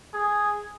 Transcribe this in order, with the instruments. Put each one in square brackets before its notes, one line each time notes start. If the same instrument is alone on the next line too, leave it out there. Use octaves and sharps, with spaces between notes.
[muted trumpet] G#4